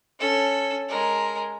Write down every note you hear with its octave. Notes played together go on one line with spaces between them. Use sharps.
C#4 A4
G#3 A#4